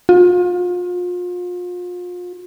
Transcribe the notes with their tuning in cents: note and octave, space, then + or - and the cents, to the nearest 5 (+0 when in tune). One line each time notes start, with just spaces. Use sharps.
F4 +35